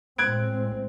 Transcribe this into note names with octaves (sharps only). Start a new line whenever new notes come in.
A2 G#3 C4 F#6 G#6 D7